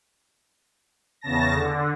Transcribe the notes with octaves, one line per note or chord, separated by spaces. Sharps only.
E2 C#3 A5 A#6
D3